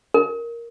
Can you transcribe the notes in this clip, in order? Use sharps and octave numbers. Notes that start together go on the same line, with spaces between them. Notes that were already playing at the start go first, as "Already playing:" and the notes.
A#4